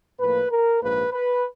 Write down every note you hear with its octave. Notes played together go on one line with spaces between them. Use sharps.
A2 F3 A#3 B4
A#4
A#1 G#2 F3 A#3 B4
B4